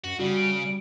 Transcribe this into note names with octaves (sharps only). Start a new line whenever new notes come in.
F#2 F#4
C#3 G3 F#4
D7
G3